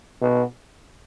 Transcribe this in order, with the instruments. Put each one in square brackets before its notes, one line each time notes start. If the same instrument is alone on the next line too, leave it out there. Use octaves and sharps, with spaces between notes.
[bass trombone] B2